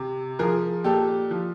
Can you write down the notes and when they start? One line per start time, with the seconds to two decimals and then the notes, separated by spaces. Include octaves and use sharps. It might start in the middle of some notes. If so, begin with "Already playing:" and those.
Already playing: C3
0.39 F3 G#4 A#4
0.84 A#2 G4 A4
1.31 F3